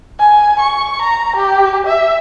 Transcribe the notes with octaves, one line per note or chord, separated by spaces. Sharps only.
G#5
C#6
A#5
G4
E5